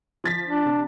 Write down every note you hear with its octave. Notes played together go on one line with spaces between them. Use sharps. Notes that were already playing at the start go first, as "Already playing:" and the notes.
F3 A6 B6
D4
C3